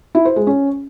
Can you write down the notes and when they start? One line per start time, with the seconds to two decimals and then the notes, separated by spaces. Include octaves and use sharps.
0.15 E4
0.25 C5
0.36 G#3
0.47 C#4